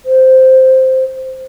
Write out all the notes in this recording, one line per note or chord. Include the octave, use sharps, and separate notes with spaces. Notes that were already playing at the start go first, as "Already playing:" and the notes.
C5